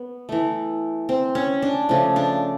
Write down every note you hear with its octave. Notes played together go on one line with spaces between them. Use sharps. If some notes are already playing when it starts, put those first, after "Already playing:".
Already playing: B3
E3 A3
C4
C#4
D4
C#3 F3 A3
D4